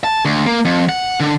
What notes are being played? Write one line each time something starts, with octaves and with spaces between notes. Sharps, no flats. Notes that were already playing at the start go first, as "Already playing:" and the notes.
A5
D2
A#3
F2
F#5
D3